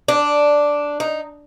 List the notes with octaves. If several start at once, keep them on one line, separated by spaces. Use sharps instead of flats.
D4
D#4